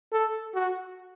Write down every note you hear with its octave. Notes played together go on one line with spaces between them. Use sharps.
A4
F#4